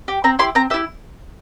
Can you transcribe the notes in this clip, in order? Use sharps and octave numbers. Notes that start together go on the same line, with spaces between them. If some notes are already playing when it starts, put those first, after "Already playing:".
G4
C4 A#5
E4 G4 C6
C4 A#5
E4 G4 E5